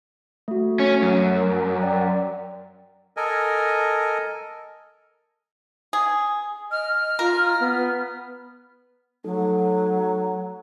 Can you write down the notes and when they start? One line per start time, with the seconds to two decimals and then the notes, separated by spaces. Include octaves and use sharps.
0.48 A3 F#4
0.80 C#4
1.02 F#2
1.36 A#4
1.81 D5 G5 A#5
3.17 A4 A#4 D#5 G#5
5.93 G#4
6.71 D#5 F6
7.19 F4 A#4
7.60 B3
9.24 F#3 A3 D#4 A4